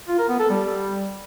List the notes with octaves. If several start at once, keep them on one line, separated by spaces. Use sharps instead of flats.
F4
A#4
B3
A4
G3